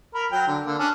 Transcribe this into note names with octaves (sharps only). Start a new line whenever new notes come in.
A#4 B5
F#3 G5 A#5
D3
D3 A#3
C#4 D4 A5